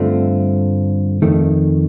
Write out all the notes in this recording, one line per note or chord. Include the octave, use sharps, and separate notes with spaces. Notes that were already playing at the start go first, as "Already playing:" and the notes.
Already playing: G2 D3 A3 C4 F4
F2 D#3 A3